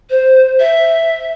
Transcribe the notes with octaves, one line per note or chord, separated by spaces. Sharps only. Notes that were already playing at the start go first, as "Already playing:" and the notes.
C5
E5